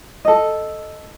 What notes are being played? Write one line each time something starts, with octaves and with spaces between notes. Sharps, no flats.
A4 D#5